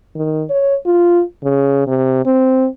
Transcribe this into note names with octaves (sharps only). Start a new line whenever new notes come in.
D#3
C#5
F4
C#3
C3
C4